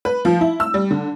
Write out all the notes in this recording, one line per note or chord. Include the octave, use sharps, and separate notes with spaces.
B4
F3
E4
E6
G3
D3